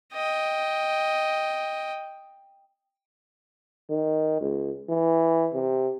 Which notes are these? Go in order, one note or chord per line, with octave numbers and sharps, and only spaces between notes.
D#5 G5
D#3
C#2
E3
C3